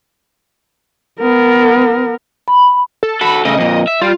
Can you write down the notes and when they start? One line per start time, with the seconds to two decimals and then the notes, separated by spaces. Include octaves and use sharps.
1.20 B3 A#4
2.48 B5
3.03 A4
3.21 F#4 A4 B5
3.45 C#3 A3 D#5
3.58 F2 A#2
3.87 E5
4.02 G3 F4